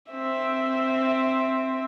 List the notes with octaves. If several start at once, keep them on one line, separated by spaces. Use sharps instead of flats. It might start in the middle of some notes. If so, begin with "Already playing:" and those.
C4 E5